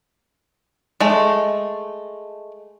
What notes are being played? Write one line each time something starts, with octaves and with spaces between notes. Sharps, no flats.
G#3 A3